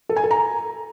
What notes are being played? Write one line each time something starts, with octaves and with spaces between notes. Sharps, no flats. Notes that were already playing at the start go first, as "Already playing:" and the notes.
A4
G#5
A4
A#5